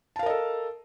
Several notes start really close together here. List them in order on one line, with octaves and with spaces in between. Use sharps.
A5 F5 A#4 D#5 A4